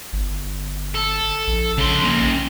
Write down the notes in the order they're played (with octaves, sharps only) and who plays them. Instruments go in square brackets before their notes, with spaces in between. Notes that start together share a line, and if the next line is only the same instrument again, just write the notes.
[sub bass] G1
[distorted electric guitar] A4
[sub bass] A#1
[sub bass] A#1 [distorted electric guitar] C#3 C6
[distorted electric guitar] A#3 C#4